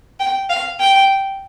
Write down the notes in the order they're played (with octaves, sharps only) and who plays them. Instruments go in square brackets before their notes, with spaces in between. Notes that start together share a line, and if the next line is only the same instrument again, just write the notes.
[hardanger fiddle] G5
F5
G5